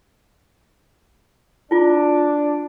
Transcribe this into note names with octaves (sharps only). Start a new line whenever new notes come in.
D4 E4 F4